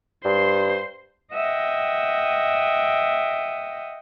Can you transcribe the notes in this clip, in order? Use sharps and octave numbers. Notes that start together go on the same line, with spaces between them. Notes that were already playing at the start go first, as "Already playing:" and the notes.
G2 C5 C6
D#5 E5 F#5 G5